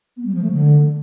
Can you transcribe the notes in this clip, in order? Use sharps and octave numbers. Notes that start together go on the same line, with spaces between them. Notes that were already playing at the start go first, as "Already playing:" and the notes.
B3
G3
F3
A3
D3